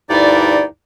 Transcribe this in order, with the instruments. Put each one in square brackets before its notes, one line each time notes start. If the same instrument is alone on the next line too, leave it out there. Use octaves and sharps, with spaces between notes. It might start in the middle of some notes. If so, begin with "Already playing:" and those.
[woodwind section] D2 G2 D#4 E4 D5